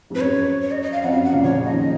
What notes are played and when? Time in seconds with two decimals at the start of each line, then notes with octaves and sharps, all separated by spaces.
0.10 F2 G#2 B4
0.21 F#2 C#5
0.62 C#5
0.71 D#5
0.82 D#5
0.92 F5
1.03 F2 F#5
1.12 F#2 F5
1.24 F#5
1.33 A#2 C#3 F5
1.43 C#3 F3 C#5
1.64 D#5
1.73 D#3